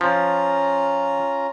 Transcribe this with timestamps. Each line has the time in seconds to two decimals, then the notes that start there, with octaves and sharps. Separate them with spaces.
0.01 F3 C#4 F4 A#5